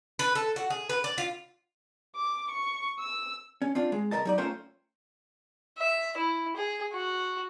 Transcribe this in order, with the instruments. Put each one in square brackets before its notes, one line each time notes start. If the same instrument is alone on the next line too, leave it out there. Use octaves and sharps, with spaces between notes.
[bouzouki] B4
A4
F#4
G#4
B4
D5
F4
[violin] D6
C#6
E6
[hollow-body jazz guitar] C#4
C4 D4 F4
G#3
C2 C#3 A#4 D#5 A5
F#3 D#4 D5
A3 C#4 F4 A#4 C5 G5
[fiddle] E5
E4
G#4
F#4